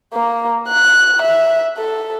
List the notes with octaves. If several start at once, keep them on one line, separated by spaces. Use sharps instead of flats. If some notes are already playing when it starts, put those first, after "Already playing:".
A#3
F#6
E5
A4